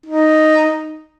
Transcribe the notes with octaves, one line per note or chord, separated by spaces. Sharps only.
D#4